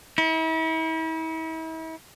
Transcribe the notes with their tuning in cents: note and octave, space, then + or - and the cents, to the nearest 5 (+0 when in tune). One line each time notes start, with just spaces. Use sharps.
E4 -40